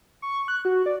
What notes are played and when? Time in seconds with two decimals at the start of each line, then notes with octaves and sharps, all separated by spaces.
0.22 C#6
0.48 F#6
0.65 F#4
0.86 D5